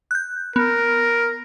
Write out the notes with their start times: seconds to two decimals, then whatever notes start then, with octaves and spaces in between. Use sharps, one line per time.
0.11 F#6 G6
0.56 B3 A#4